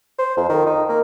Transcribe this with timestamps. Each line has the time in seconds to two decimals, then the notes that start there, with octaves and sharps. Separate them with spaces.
0.19 C5
0.37 F2
0.49 D#3
0.66 D#4
0.89 A#3